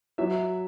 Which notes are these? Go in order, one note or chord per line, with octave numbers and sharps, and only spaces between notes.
F#3 E5